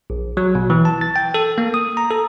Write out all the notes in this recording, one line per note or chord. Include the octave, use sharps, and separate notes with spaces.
A#1
F#3
B2
E3
A5
A6
G5
A4
A#3
D#6
A#5
A4